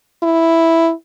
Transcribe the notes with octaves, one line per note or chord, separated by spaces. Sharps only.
E4